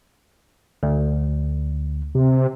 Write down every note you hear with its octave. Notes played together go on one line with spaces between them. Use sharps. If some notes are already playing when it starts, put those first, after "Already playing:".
D2
C3